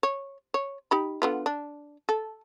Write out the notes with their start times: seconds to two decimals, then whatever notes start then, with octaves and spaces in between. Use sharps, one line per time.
0.03 C#5
0.54 C#5
0.91 D#4 G4 B5
1.22 D3 B3 F4
1.46 D4
2.09 A4